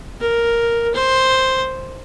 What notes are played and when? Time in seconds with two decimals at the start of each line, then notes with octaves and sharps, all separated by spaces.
0.21 A#4
0.95 C5